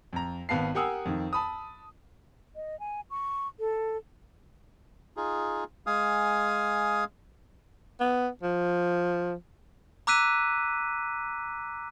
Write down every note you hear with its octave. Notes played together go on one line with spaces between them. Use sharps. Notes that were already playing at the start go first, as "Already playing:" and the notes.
F2 A#5
G#1 B3 F5 A5 C7
G4 A#4 F#5 G#5 D#6 E6
F2 D#3
A5 B5 D#6
D#5
G#5
C#6
A4
D#4 F4 G#4
G#3 F5 G#5 D#6
B3
F3
A#5 D6 E6 F#6 B6 D#7